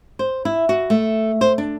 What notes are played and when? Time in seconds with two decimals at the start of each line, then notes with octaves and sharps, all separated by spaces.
0.19 C5
0.45 E4
0.69 F#4
0.90 A3
1.41 C5
1.58 D4